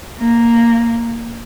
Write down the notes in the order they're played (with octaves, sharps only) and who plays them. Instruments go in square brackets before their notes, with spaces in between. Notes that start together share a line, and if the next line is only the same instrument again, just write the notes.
[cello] A#3